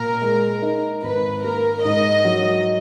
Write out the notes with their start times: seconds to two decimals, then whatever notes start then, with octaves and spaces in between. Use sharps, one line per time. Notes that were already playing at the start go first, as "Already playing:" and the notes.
Already playing: A#2 A#4
0.22 G#3
0.62 D#4
1.03 G#1 B4
1.44 A#3 A#4
1.84 G#2 D#5
2.25 F#3